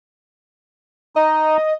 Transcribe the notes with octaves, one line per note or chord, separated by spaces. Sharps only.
D#4 D#5